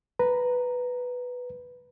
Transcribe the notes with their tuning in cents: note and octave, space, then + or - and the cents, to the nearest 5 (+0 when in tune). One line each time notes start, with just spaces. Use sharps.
B4 +0 A#5 +0